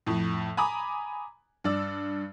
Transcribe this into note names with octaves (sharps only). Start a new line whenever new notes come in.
F2 A2
G#5 A#5 B5 D6 D#6
G2 D5 E6